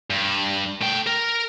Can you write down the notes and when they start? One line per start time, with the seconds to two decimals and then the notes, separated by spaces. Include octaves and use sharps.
0.10 G2
0.81 A3 G5
1.07 A#4